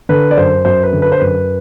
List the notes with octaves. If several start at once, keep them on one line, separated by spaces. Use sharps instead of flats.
D3 B4
D5
F#2 C5
F#2 C5
B4
D3
B4
C5
F#2 B4